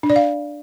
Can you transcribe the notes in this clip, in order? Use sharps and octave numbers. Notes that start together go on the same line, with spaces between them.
D4
D5
F5